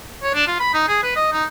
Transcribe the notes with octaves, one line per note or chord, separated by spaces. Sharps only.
C#5
D4
F4
B5
D#4
G#4
B4
D#5
D#4